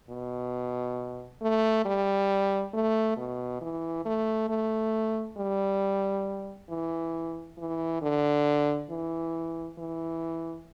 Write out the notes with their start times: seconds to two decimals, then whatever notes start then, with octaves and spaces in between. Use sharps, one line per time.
0.10 B2
1.42 A3
1.85 G3
2.74 A3
3.17 B2
3.61 E3
4.05 A3
4.49 A3
5.37 G3
6.70 E3
7.58 E3
8.02 D3
8.90 E3
9.78 E3